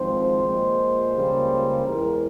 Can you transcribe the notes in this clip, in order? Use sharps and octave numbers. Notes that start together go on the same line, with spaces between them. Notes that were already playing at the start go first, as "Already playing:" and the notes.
Already playing: G#1 G#2 F3 C4 C5
A#1 A#2 G#3
C#2 C#3 G3 A#3
E2 E3 G#3 A#4